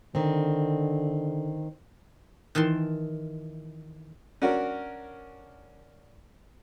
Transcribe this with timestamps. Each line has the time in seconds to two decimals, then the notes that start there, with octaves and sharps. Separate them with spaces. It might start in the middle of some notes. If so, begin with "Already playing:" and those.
0.15 D3 D#3 C4
2.55 D#3 E3 A5 C6
4.42 C#4 D4 F#4 A#4